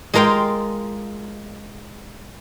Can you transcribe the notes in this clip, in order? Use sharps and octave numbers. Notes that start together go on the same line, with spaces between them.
G#3 F4 A#4 F5 G5